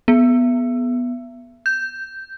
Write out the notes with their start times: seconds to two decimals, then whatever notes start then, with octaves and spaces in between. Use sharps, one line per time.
0.08 B3
1.66 G6